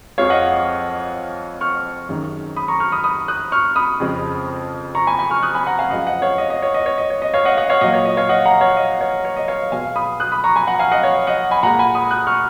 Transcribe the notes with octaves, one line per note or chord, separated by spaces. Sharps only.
F2 F3 G#3 C#5 F5
D#5 F#5
C#6 F6
F#2 D#3 G#3
B5 D#6
A#5 C#6
C#6 F6
B5 D#6
B5 D#6
D#6 F#6
C#6 F6
B5 D#6
F2 C#3 F3 G#3
A#5 C#6
G#5 B5
G#5 B5
C#6 F6
D#6 F#6
G#5 B5
F#5 A#5
F5 G#5
F#2 F3 G#3 D#5 F#5
D#5 F#5
C#5 F5
D#5
D#5
C#5
D#5
C#5
D#5
C#5
D#5
C#5 F5
D#5 F#5
D#5 F#5
C#5 F5
A#2 F#3 D#5
C#5
D#5
C#5 F5
D#5 F#5
F#5 A#5
C#5 F5
D#5
C#5
C#5
D#5
C#5 F5
B2 G#3 F5 G#5
B5 D#6
D#6 F#6
B5 D#6
A#5 C#6
G#5 B5
F#5 A#5
F5 G#5
D#5 F#5
C#5
D#5
D#5 F#5
G#5 B5
A#2 G#3 F#5 A#5
G#5 B5
B5 D#6
D#6 F#6
C#6 F6